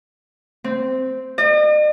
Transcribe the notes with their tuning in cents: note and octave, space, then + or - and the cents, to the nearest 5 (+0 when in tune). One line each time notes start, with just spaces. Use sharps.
C4 -10
D#5 -45